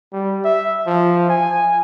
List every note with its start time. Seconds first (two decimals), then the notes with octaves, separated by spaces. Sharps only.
0.13 G3
0.45 E5
0.86 F3
1.30 G#5